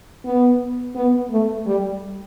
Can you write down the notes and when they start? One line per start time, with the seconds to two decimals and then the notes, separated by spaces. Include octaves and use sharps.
0.25 B3
0.95 B3
1.31 A3
1.66 G3